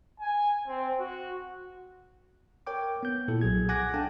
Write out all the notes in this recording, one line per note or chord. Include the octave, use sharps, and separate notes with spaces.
G#5
C4
F#4
A#4 C#5 G5 D6
B3 G6
A#2 E4 A4
B1 F#3 G#4 G#6
F#5 G#5 D6 F#6 G#6 A#6
D4 A4 F5 G5 A5